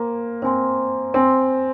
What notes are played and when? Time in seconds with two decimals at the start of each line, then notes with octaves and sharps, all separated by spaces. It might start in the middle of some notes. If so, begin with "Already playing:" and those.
Already playing: A#3 C5 G#5 C6
0.42 C4 C5 G#5 C6
1.14 C4 C5 G#5 C6